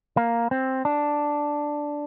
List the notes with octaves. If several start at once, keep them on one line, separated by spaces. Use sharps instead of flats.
A#3
C4
D4